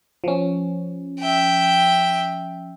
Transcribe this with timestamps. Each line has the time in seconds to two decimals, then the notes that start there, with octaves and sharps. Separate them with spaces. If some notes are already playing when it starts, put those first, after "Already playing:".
0.24 F3 C#4
1.20 E5 G5